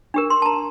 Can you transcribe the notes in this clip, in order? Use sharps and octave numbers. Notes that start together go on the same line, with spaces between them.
D4 G4 A#4
C6
A5
A#5